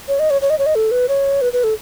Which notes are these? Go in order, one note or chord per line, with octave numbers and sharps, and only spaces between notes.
C#5
D#5
C#5
C#5
D#5
C#5
D#5
A4
B4
C#5
B4
B4
A4